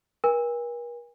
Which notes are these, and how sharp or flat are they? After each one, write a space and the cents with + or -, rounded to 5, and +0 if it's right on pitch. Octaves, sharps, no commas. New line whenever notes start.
A#4 +45 G#5 -40